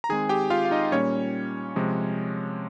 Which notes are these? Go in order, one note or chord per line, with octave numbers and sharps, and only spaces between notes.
A#5
D#3 G#3 C4 G#4 G#5
G4 G5
F4 F5
F5
D#4 D#5
A#2 G3 A#3 C#4 C#5
C3 F3 G#3